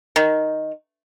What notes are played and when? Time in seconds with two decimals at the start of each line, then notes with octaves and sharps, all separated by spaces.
0.16 D#3